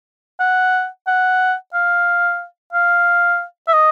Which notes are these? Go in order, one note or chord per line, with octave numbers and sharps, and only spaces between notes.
F#5
F#5
F5
F5
E5
D#5